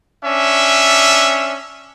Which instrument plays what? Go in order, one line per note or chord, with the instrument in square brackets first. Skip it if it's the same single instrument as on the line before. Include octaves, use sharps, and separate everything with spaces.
[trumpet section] C#4 D4 E5